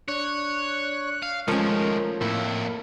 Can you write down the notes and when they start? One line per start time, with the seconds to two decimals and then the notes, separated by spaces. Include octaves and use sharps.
0.08 D4 C#5 F#6
1.23 F5
1.48 D#3 F3 G#3 A3 C#4 A#4
2.21 F2 A2 A#3 E4